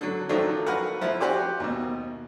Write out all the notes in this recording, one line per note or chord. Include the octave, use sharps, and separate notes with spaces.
D3 F#3
D3 D#3 F3 F#3 A3 D4
F#4 A#4 B4 F5 F#5
F3 E4
F#4 G4 C5 D5
D#2 B2